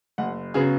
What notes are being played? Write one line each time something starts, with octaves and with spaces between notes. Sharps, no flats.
F#1 F#5
C#3 F#3 B3 G#4